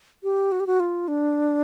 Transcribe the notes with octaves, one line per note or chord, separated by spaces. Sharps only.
G4
F#4
G4
F#4
F4
D4